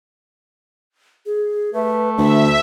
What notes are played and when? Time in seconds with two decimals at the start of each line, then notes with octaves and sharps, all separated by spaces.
1.26 G#4
1.73 A3 B4
2.18 D2 D4 E5